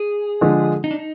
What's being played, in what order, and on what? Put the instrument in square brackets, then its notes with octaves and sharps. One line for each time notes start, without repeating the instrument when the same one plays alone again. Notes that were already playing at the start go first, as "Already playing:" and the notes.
Already playing: [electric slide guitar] G#4
[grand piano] D3 F3 G#3
[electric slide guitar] D#4
D4
D#4